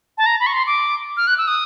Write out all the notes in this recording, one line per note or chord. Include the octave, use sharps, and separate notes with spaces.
A5
A#5
B5
C#6
C6
D6
F6
F#6
E6
D#6